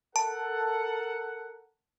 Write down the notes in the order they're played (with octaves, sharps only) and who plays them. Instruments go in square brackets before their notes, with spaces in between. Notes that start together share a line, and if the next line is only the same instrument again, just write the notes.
[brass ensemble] A4 A#4 F#5 [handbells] A5